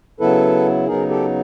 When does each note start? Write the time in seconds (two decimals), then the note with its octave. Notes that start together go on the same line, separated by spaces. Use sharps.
0.20 C#3 F#3 B3 E4 A4 B4
0.87 C#3 F#3 B3 D#4 G#4 A#4
1.09 G4 A4